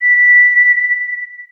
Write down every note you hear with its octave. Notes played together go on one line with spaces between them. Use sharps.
B6